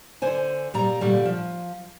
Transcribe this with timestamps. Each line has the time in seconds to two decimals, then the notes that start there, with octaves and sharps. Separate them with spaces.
0.22 D3 C5 G#5
0.74 A#2 G3 A#5
1.01 A#2 D3 G3 A3
1.25 F3